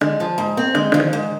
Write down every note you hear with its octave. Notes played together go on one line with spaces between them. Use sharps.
D3 G#3
F3
G#2
C4
D3 G#3
D3 F3
D#3
G#2